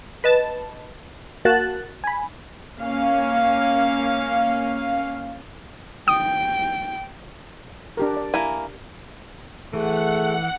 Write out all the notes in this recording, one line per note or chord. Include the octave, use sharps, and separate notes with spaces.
B4 D#5 A5
A#3 F#4 A5 F#6 A6
G#5 B5
A#3 C#4 F5
G5 D#6
D4 G4 A#4
D5
A#3 E4 G#5
E3 A3 G#4 F#5